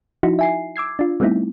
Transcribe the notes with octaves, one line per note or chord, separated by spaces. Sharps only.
F3 D#4 E4 F#4
E5 G#5 C7
D6 E6 G#6 C7
D4 F4
G3 A3 B3 C4 D#4 E4